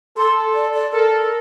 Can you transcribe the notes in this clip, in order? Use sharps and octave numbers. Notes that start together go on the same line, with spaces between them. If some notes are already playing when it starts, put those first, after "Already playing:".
A4 C6
D5
D5
A4 A#4